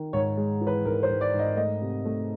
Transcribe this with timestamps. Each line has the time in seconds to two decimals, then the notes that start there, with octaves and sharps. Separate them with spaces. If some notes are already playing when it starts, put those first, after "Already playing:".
Already playing: D#3
0.13 G#2 C#5
0.37 G#3
0.61 E3
0.67 B4
0.85 G#2 A#4
1.03 C5
1.10 G#2
1.21 D5
1.34 G#2
1.39 D#5
1.57 A3 D#5
1.81 C3
2.05 A3